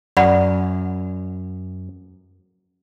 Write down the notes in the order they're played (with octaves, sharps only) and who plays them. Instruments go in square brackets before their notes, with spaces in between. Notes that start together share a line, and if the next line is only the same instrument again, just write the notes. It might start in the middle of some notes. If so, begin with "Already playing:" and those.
[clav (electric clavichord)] F#2 [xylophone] D5 F#5 B5